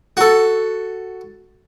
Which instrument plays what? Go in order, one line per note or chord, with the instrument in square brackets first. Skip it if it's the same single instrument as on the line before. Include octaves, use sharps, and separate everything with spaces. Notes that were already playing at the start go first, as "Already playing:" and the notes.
[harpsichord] F#4 A4